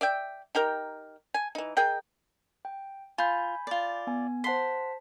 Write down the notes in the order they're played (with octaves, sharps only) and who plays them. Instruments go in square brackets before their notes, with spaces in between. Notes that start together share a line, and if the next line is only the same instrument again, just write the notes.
[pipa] D5 E5 G5
D#4 G4 A#4 G5
G#5
E3 D#4
G#4 A#4 D#5 G5
[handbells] G5
[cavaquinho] F4 [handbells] G#5 B5 G6
[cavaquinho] F4 D5
[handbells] B3 G#5
[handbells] C5 A5 B6 [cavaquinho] F#5 C6